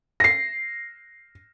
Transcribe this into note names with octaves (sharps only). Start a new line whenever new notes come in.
A#6 C7